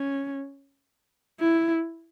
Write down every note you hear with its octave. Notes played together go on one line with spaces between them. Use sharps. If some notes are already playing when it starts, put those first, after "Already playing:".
Already playing: C#4
E4